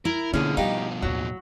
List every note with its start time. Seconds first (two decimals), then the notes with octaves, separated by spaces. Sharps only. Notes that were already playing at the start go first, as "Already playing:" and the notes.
0.05 E4 A#4
0.34 B2 D3 F3 A#3 C#4 G#4
0.57 G3 D#4 G4 F5
1.02 D#2 A2 F#3